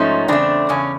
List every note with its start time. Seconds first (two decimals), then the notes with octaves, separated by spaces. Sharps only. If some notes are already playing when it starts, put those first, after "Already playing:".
Already playing: G#2 F3 A3 C#4 D#4
0.28 E2 C#3 A3 C4 D4
0.69 E2 C#3 C#4